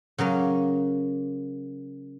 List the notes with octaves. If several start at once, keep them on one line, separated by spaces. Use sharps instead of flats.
C#3 F#3 A#3 C#4